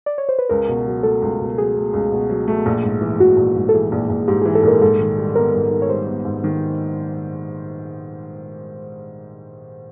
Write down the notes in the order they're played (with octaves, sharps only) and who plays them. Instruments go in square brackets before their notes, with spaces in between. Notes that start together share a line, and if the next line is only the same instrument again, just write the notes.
[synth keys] D5
C#5
C5
B4
[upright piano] C#2 [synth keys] A#4
[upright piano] B2
F#3
[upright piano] A3 [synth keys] A4
[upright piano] C#2
B2
[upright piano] F#3 [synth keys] G#4
[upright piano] A3
C#2
B2
F#3
A3
A#1
G#2
E3
[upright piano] A#1 [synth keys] F#4
[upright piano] A#1
G#2
[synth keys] A4
[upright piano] E3 [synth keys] G#4
[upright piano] A#1
A#1
[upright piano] G#2 [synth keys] G4
[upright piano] E3 [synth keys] G#4
[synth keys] A4
[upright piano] A#1 [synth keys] A#4
[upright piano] G#2 [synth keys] A4
[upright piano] D#3
G3
[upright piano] B3 [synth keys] A#4
[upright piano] G#2
D#3
[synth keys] C#5
[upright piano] G3 [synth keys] C5
[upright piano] B3
G#2
D#3